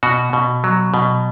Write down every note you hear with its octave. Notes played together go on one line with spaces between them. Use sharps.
B2 F#4
B2
F#3
B2